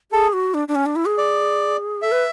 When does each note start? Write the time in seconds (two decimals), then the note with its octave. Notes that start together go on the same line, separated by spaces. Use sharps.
0.12 G#4 A4
0.33 F#4
0.54 D4
0.68 D4
0.75 C#4
0.86 D4
0.96 E4
1.07 G#4
1.18 D5
2.02 A4 E5
2.12 B4